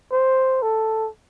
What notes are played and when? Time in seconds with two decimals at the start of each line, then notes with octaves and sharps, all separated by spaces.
0.12 C5
0.62 A4